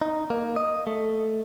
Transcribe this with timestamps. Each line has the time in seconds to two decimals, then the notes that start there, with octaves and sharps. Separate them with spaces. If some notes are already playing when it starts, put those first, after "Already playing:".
0.02 D#4
0.30 A#3
0.56 D#5
0.87 A3